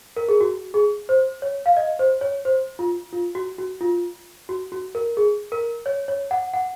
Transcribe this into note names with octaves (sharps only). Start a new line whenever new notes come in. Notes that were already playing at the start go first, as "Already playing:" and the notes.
A#4
G#4
F#4
G#4
C5
C#5
F5
D#5
C5
C#5
C5
F4
F4
F#4
F#4
F4
F#4
F#4
A#4
G#4
A#4
C#5
C#5
F#5
F#5